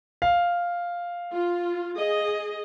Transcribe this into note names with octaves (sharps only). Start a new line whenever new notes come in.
F5
F4
G#4 D#5